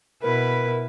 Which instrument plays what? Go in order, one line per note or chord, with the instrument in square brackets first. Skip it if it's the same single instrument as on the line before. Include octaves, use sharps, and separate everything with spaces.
[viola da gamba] B2 E4 B4 [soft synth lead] A#4